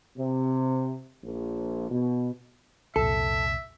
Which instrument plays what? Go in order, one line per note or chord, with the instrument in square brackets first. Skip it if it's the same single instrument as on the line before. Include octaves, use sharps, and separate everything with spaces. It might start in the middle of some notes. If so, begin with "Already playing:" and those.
[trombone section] C3
A#1
B2
[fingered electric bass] C2 F2 A#2 [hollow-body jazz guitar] A4 [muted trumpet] E5